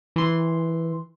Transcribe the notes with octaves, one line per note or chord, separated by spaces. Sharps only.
E3 C6